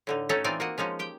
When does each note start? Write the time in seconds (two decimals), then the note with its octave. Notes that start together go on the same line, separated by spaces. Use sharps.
0.07 A2 D3 D#4
0.29 A3 C#4 D#4 F#4 A4 C#5
0.44 E3 C4 D#4 F4 D5 G#5
0.60 A#3 F#4 D#5
0.78 F3 G#3 C#4 D#4
0.99 G4 G5